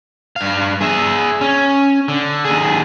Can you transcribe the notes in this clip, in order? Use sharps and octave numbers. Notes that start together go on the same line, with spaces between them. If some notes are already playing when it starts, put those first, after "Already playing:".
G2 F5
G#4 E5
C#4
D3
D#2 G#4